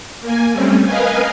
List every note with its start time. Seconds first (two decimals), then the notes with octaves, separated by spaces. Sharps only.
0.21 A#3 G#5
0.53 G3 A3 C4 C#4
0.85 A#4 B4 D#5 F5 G#5